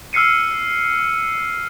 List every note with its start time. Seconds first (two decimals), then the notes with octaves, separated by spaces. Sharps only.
0.13 E6 F6 C7 C#7 D#7